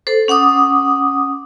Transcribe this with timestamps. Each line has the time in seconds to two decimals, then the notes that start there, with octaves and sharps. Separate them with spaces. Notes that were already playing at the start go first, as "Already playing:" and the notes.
0.07 A4 C5
0.28 C#4 F#5 D6 D#6